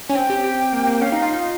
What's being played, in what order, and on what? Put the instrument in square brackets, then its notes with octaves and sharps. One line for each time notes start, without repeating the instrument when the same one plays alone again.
[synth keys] C#4 [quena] G#5
[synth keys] C4 [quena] G5
[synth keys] G4
G4
A#3
A#3
[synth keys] C#4 [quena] F5
[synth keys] D#4
F4
D#4